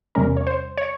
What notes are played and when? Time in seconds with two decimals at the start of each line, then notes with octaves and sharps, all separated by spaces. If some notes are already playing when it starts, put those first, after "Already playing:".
0.15 E2 C3 G3 C#4 A#4
0.37 C#5
0.47 C5
0.77 C#5